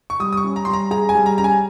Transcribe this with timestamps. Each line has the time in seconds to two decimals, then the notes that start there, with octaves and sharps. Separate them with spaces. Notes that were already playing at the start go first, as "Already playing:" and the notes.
0.10 C#6
0.20 G3 D#6
0.33 D#6
0.37 C#6
0.44 C#4
0.56 A#5
0.65 G3 C6
0.73 A#5
0.91 G#4 A#5
1.09 G#5
1.15 G3
1.26 A#5
1.37 C#4 A#5
1.44 G#5